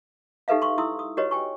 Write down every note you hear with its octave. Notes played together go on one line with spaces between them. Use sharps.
D#4 G4 A4 B4 E5 F5
C6 C#6
E4 C6 D#6 E6
D#6
F#4 G4 B4 C#5 D#5
G5 G#5 C#6